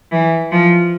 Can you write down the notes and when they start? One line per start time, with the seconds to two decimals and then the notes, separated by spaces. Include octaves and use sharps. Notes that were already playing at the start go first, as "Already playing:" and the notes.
0.12 E3
0.51 F3